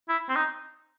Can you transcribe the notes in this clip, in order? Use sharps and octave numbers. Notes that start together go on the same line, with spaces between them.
E4
C4
D#4